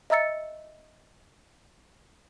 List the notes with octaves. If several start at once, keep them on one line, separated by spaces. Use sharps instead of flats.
D#5 E5 A#5 E6 A6 C#7